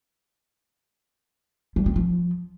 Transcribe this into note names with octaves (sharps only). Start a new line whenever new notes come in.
G3
C4
F3